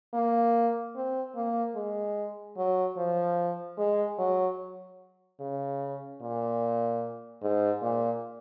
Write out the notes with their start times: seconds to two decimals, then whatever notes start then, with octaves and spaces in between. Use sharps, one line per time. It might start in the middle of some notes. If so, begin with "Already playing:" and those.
0.14 A#3
0.96 C4
1.35 A#3
1.76 G#3
2.57 F#3
2.97 F3
3.78 G#3
4.18 F#3
5.40 C#3
6.22 A#2
7.42 G#2
7.82 A#2